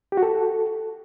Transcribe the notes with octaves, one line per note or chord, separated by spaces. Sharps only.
G4
F#4
A4